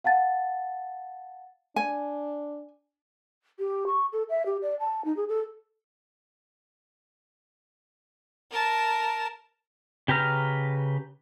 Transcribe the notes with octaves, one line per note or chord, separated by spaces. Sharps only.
F5 F#5 A5 A6
D4 G#5
G4
C#6
A4
E5
G4
D5
A5
D#4
G#4
A4
A#4 A5
C#3 G4 B4 A#5 F6